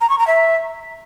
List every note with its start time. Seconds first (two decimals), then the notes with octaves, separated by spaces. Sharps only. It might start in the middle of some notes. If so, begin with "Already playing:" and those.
0.01 A#5
0.09 C#6
0.18 A#5
0.27 E5